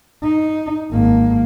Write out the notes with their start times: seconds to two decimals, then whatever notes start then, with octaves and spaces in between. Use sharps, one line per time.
0.23 D#4
0.92 G#1 A#3